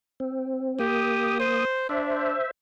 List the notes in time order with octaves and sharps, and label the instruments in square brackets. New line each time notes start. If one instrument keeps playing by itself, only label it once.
[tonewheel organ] C4
[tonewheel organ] A#3 D#6 [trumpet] G4
[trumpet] C5
[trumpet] D4 [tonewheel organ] C5 E5